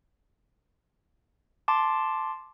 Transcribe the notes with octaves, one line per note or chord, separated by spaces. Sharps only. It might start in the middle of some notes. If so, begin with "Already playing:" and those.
A5 C6 D6